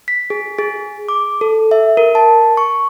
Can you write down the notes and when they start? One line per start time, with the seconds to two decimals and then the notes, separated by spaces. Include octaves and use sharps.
0.08 B6
0.30 G#4
0.58 G#4
1.09 D6
1.41 A4
1.71 E5
1.97 A#4
2.15 A5
2.57 C#6